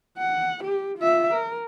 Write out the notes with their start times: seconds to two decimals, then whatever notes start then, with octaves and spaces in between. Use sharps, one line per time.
0.18 F#5
0.64 G4
0.98 F4 E5
1.34 A#4